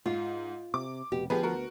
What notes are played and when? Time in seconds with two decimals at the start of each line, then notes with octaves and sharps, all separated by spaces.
0.06 G#2 F4
0.74 C3 D6
1.12 F1 B2 G4
1.30 D2 F3 B3 G4 G#4 B4
1.43 F#4 A#4